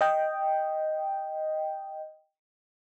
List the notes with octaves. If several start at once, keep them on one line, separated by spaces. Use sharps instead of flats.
D#5 G5